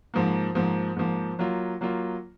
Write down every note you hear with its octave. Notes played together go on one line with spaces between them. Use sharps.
G#2 F3 A#3
G#2 F3 A#3
G#2 F3 A#3
F#3 A#3 F4
F#3 A#3 F4